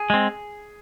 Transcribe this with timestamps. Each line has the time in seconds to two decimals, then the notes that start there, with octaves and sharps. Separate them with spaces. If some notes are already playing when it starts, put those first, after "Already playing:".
Already playing: G#4
0.10 G#3 C4